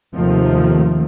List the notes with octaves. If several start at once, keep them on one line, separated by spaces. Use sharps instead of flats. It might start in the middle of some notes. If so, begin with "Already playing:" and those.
D#2 C3 D#3 F3 A3